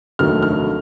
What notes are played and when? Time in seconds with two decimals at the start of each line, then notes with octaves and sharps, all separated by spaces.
0.19 F1 D#2 D3 F#3 A3 F6
0.43 F6